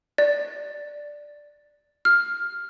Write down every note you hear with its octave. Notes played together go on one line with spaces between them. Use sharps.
D5
F6